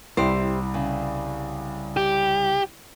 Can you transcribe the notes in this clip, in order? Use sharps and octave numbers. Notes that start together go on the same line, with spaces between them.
C2 E4 G4 C5
C#3
G4